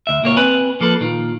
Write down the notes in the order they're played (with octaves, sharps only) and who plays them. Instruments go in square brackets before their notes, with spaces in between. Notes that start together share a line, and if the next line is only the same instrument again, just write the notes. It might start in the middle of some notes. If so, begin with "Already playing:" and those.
[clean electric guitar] D2 E5
C#2 A#2 A#3 C#5
C4 B4 G#5 B5
F3 A#3 A4 B4
A#2 D#3 F4